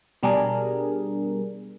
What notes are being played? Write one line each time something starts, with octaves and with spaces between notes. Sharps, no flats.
B2 G3 D4 G#4 A#4